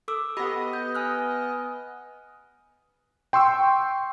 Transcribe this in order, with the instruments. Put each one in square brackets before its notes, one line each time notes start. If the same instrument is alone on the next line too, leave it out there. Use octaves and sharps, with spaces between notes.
[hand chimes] A4 D6 E6
[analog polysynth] B3 D#5 [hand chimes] G4 B5
[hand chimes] G6
G#5 F6 F#6
[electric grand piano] G5 C6 C#6 E6